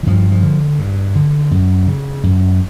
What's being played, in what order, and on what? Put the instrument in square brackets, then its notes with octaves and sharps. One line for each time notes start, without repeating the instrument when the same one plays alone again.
[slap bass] E3
G2 F3
F3
D3
G2
D3
F#2
C#3
F#2